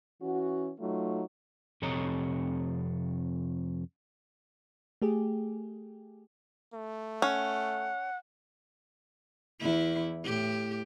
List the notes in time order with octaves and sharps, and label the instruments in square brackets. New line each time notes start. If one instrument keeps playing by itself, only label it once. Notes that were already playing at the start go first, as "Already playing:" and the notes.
[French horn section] E3 C#4 F#4
F#3 A3 D#4 F4
[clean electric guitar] F2 C3 A4 C#5 D#5 A#5
[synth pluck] A3 G4 G#4
[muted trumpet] A3
[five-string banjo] C#4 [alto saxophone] F#5
[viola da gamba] E2 E4
A2 G4